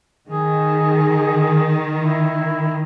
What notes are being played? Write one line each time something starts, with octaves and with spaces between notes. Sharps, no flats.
D#3 G#4
E4